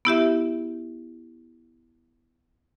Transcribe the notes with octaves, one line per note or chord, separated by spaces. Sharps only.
B3 E4 G4 E5